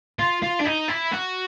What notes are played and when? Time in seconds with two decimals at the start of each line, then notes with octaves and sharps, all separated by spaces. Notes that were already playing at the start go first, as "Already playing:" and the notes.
0.19 F4
0.42 F4
0.59 D4
0.65 D#4
0.88 E4
1.12 F#4